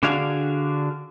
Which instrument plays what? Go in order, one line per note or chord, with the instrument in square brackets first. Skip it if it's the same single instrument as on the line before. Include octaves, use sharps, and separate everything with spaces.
[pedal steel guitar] D3 D4 F#4 G#4 F5